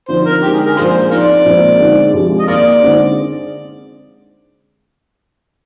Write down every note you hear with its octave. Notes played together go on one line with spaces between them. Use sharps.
D3 F3 C4 D#4 C5
A#4
D3 G#3 D#4 G4
G#4
A#4
A#2 F3 G#3 D4 F4 G#4 C5
F3 C4 D#4 F4 A#4 D5
A#2 F3 G#3 C4
D3 G#3 C4 D#4
C3 F3 G#3
D#5
D#3 A#3 D#4 F4 A#4 D5
D3 G#3 C4 D#4